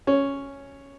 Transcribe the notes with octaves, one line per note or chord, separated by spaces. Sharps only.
C#4